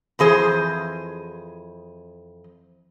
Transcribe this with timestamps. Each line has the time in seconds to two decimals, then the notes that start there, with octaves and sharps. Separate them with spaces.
0.19 F2 E3 G#4 C5